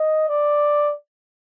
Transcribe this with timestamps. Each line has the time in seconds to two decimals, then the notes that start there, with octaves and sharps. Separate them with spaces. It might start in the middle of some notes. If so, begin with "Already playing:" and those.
Already playing: D#5
0.29 D5